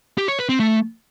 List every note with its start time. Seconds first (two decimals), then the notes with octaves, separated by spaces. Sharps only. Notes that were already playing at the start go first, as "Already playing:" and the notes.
0.18 G4
0.28 C#5
0.39 B4
0.49 C4
0.60 A3